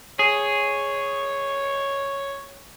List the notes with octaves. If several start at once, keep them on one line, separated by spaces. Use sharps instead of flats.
G#4 C#5